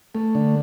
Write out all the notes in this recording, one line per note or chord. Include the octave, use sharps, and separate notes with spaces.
A3
D3